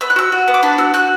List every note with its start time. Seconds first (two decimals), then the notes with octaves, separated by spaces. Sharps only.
0.01 B3 E6
0.10 F#6
0.16 F#4 E6
0.32 F#4
0.48 B3
0.54 D6
0.63 D4 B5
0.78 F#4 E6
0.94 F#4 F#6